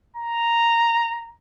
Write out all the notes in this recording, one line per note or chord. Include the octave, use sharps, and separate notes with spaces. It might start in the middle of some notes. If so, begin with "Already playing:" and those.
A#5